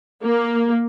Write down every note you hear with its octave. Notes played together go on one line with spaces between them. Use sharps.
A#3